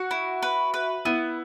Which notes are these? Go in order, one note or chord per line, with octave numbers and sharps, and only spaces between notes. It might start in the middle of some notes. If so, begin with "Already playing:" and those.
Already playing: F#4 F#5
E4
B4
B4
B3 E4